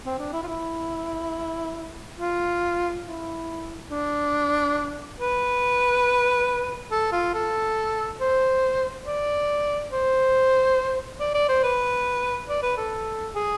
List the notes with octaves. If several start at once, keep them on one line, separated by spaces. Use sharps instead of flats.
C4
D4
E4
F4
E4
F4
E4
D4
B4
A4
F4
A4
C5
D5
C5
D5
D5
C5
B4
D5
B4
A4
G#4